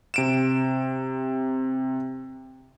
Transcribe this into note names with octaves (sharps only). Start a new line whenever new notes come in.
C3 D7 E7